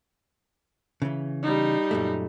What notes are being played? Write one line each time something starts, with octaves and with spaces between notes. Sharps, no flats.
C#3 E3
G3 D#4
F#2 A#2 A3